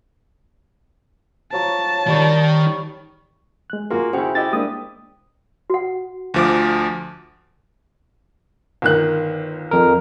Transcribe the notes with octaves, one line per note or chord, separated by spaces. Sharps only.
F3 F#3 C#5 A5
D#3 G3 C#5
G#3 F#6
F#2 A#3 F4 F#4 G#4 C6
C#3 E4 F#4 G#4 C5 G5
E4 G4 D#5 A6
G#3 A#3 D4 D#6
F#4 F#5
D2 F3 D6
G1 D#3 F#6
F2 A#4